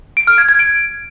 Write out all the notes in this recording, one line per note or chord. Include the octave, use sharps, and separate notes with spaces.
D7
F6
G#6
G#6
D7